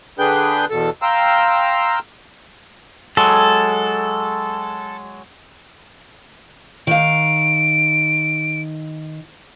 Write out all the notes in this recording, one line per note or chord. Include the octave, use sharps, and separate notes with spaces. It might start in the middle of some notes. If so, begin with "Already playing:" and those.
D3 D4 G#4 B4 G5 G6
E2 B2 A4
F5 G5 A#5 C6 E6
F#3 G#3 A4
D#3 F5 D7